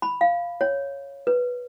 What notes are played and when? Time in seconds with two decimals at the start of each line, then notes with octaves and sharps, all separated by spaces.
0.02 B5
0.21 F5
0.61 C#5
1.27 B4